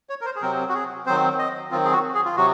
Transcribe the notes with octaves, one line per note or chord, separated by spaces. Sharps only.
C#5
A#4
C5
G#4
C3 F#3 C4 A#4
F#4
G#4
D#3 F#3 C4 C5
D#5
D#3 F#3 C4 F4
G#4
F#4
G#4
F4
C3 F#3 F#4